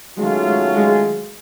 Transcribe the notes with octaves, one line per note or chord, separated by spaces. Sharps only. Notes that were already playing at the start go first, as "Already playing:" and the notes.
D#3 F#3 G#3 A3 C#4 F4
G#3
G#3